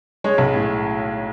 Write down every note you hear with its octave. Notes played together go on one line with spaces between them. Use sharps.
G#3 C#5
B1
A2